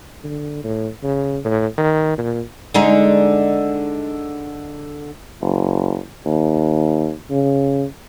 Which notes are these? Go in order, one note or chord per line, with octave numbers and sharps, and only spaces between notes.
D3
A2
C#3
A2
D#3
A#2
D3 G#3 D#4
F#1
D#2
C#3